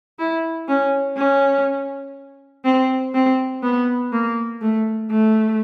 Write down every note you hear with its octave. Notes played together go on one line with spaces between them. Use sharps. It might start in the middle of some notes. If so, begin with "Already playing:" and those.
E4
C#4
C#4
C4
C4
B3
A#3
A3
A3